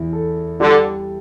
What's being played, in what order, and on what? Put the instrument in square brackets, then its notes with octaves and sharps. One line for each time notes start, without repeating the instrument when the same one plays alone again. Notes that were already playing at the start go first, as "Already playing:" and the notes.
Already playing: [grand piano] E2 E4
A4
[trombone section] D3 [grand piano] G3